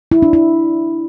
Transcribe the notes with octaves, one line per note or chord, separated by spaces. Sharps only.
E4
D4
E4